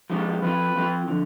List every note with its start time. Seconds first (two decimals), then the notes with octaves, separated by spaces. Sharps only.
0.10 F3 G#3 C4 D#4
0.42 F3 C4 F4 B4
0.75 F3 C4 F4
1.08 D3 F3